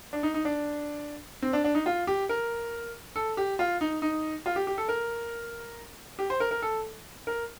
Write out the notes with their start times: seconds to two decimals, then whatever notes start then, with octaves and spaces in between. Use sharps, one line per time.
0.13 D4
0.23 D#4
0.34 D#4
0.45 D4
1.42 C4
1.53 D4
1.64 D4
1.75 D#4
1.86 F4
2.07 G4
2.29 A#4
3.16 A4
3.37 G4
3.59 F4
3.81 D#4
4.02 D#4
4.46 F4
4.56 G4
4.67 G4
4.78 A4
4.89 A#4
6.19 G4
6.30 C5
6.40 A#4
6.51 A#4
6.62 A4
7.27 A#4